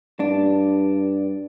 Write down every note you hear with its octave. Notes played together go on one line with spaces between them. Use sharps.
G2 D4